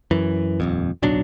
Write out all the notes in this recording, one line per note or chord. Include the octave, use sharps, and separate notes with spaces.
F#2 E3
D#1 G#1 F2
D1 B1 F#3 D4